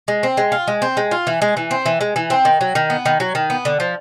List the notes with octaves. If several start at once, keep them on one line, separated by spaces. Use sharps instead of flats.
G#3
C4
G#3
F4
G#3
C4
G#3
F4
E3
G#3
E3
C4
E3
G#3
E3
C4
D#3
F#3
D#3
B3
D#3
F#3
D#3
B3
D3
F3